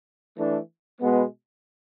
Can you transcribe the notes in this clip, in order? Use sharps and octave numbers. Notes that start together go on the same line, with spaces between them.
E3 A3 D4
B2 G#3 B3